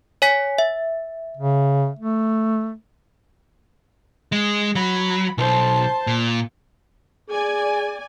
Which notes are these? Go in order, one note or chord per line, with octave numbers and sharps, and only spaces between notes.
C#5 G#5 B6
E5
C#3
A3
G#3
F#3 B5
B1 C5 A5
A#2
G#4 D5 G#5